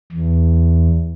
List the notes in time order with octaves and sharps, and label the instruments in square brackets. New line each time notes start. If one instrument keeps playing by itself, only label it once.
[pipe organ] E2